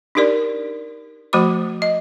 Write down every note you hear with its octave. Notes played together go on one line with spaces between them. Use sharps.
D4 D#4 G4 A#4 D5
F3 A3 F#4 C5 B5 D6
D#5